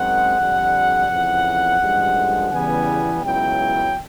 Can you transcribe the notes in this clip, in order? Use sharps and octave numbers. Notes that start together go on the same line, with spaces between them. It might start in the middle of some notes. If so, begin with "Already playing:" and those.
Already playing: F#2 D#3 G#3 C4 F#5
F2 D3 G3
F2 C#3 E3
A1 G2 D3 F3 G#3
E2 C#3 E3 G3 B3 G#5
C#2 C#3 F#3 B3 E4 G5